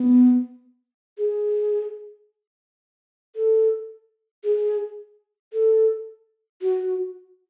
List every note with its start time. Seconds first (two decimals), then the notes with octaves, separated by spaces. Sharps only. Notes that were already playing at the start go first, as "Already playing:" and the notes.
Already playing: B3
1.18 G#4
3.35 A4
4.44 G#4
5.53 A4
6.62 F#4